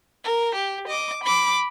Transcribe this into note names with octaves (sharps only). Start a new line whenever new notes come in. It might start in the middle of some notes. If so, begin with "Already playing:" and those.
A#4
G4
D#5 D6
B5 D6